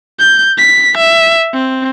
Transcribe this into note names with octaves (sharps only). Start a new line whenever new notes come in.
G6
B6
E5
C4